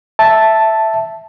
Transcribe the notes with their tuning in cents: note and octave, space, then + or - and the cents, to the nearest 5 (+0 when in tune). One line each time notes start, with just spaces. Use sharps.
E5 +0 A5 +0